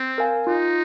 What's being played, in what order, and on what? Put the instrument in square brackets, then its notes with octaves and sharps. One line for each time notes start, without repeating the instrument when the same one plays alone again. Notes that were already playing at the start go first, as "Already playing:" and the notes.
Already playing: [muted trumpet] C4
[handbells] A#4 F5 G#5
[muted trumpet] D#4 [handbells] F4